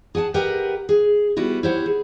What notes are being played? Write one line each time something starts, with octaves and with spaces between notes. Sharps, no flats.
G#4 F#5 G#5 A5
G4 A#4 B4 D#5 F#5 G5
G#4
G3 B3 E4 F#4
E4 G4 C5 C#5 F#5
G#4